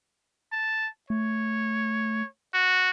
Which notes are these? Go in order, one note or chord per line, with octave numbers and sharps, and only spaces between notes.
A5
A3 C#5
F#4